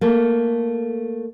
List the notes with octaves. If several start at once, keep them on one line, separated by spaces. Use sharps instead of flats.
A3 A#3